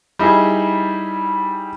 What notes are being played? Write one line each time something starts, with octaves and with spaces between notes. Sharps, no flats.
G3 D#4 E4 G#4